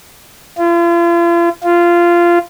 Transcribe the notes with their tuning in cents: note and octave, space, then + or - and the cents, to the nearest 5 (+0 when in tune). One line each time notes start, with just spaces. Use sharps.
F4 -40
F4 -15